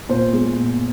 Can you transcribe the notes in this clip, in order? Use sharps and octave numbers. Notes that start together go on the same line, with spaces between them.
A#2 C5
G#3
A#2